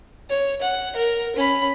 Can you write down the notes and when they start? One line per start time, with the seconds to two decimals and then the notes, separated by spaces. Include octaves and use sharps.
0.29 C#5
0.62 F#5
0.96 A#4
1.36 C#4 B5